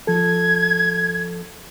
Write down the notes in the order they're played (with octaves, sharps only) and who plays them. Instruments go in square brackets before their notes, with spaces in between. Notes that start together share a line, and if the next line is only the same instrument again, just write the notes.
[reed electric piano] F3 A4 [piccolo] G#6